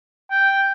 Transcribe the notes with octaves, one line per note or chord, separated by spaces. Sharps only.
G5